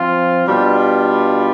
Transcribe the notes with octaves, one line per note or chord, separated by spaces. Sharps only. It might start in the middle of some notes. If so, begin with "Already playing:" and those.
Already playing: F3 C4 F4
B2 G3 D4 F4